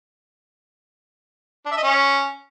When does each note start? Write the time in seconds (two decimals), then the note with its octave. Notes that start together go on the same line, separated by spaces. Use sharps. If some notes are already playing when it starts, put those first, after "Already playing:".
1.66 D4
1.72 E5
1.77 D#5
1.83 C#4